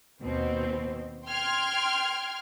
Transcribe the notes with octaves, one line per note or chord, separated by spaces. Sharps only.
D#2 B2 C4
G5 C6 F6 G#6